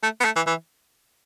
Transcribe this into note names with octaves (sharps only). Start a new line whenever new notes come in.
A3
B3
A3
E3
E3